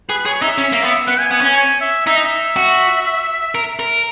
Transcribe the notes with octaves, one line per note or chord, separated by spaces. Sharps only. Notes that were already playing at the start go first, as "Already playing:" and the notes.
G#4 B4
G#4 C#5
D#4 E5
C#4
A#3
B3
B3 F#5
G#5
B3 G#5
C#4 G#5
G#5
E5
D#4 E5
D#5
E5
F#4
A#4
A#4